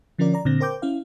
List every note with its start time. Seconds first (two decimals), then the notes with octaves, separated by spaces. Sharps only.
0.19 D3 F3 C#4 F4 A#4 D5
0.34 D5 A#5
0.45 A#2 D3 C4 A#6
0.60 A#4 C5 G5 D6 G6
0.82 C#4 E4 F5